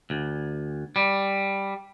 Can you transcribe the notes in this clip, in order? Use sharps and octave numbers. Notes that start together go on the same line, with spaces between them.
D2
G3